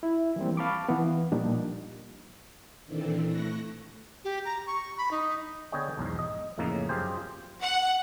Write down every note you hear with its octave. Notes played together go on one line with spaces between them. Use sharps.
E4
E3 F3 G3 A#3 C4
F5 A5 B5 C#6 D6
E3 B3
A#2 F3 G3 A#3 D4 D#4
A#2 D#3 E3 C4 D4 A4
A3 E4 C#6 F#6 A#6
G4
A#5
C#6
B5
D#4
D3 B3 G#4 C#5 D#5 G5
B1 E2 G#2
D#5
F2 A2 C#3 A#3 D#4
F#2 F4 G4 G#4 C5
F#5